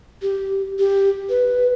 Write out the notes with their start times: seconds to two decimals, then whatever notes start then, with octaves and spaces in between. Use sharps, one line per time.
0.22 G4
0.79 G4
1.29 B4